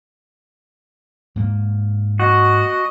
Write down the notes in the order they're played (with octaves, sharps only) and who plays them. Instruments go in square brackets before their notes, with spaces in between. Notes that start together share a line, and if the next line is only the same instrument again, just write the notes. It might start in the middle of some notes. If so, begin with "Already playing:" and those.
[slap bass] G#2 A#3
[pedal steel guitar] F#4 [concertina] D#5 D#6